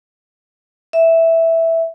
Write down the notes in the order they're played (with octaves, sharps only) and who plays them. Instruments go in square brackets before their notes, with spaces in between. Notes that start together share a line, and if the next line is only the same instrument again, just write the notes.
[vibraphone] E5